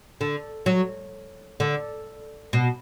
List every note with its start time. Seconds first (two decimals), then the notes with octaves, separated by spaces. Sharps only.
0.21 D3
0.66 F#3
1.60 D3
2.53 B2